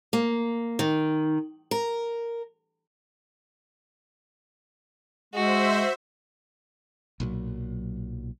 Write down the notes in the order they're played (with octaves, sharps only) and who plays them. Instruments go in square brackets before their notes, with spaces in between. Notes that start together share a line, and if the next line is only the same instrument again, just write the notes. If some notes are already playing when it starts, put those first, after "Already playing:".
[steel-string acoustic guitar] A#3
D#3
A#4
[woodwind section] G#3 [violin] F#4 [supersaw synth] C5 E5
[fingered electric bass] B1 A#2 E3 F#3